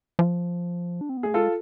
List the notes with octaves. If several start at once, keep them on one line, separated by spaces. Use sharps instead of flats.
F3
D4
C4
B3
A3 G#4
G#3 F4 A4